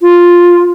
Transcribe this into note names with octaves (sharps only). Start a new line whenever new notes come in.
F4